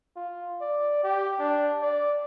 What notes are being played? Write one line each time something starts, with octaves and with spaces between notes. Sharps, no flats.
F4
D5
G4
D4
D5